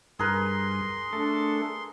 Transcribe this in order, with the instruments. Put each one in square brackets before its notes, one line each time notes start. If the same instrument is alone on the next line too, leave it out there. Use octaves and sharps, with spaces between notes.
[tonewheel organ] G2 [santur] G#4 A#4 B4 [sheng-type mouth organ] C6
[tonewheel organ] A3 A4 [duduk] D4